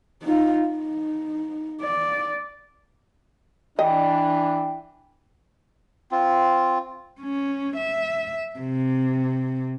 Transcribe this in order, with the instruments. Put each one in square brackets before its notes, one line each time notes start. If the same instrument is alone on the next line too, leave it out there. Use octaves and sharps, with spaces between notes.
[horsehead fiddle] D#4 F4
D#4
D5
[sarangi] E3 [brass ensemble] D4 [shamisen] D#5 [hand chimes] G5
[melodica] C4 F4
[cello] C#4
E5
C3